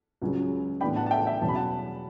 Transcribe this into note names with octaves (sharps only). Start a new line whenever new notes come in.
C#2 C#3 F#3 C#4
A2 E3 B3 D4 G5 B5
F#5 A5
A5
E5 G5
E5 G5
E2 B2 F#3 C#4 A5
B5
F#5 A5